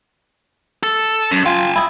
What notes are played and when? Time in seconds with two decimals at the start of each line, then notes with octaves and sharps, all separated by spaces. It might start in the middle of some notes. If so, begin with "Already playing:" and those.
0.83 A4
1.31 F#2
1.46 F4 G5 G#5
1.76 E4 D#5